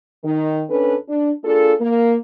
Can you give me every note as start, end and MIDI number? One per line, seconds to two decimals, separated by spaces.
0.24 0.62 51
0.70 0.96 39
0.70 0.96 61
0.70 0.96 62
0.70 0.96 69
0.70 0.96 71
1.09 1.30 62
1.44 1.73 58
1.44 1.73 62
1.44 1.73 65
1.44 1.73 68
1.44 1.73 69
1.80 2.16 58